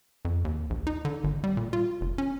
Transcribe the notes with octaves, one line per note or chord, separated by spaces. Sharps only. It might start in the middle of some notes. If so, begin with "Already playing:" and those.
F2
D#2
A#1
D#4
D3
G#1
G3
A#2
F4
F1
C#4